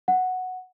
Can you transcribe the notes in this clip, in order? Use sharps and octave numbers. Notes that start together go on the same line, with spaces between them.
F#5